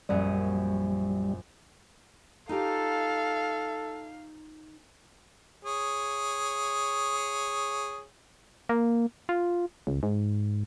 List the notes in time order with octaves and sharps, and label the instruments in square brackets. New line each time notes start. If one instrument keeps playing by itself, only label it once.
[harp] A#1 F#2 D#6 [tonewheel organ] G3
[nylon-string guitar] D#4 F4 G4 [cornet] A4 [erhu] F5
[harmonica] G#4 C#5
[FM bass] A#3
F4
C#2
G#2